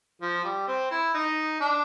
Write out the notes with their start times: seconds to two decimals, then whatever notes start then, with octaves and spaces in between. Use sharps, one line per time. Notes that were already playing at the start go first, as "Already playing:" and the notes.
0.22 F3
0.44 G3
0.67 C4
0.91 E4
1.14 D#4
1.61 D4